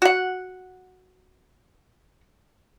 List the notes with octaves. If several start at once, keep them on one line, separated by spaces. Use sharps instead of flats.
F#4 F#5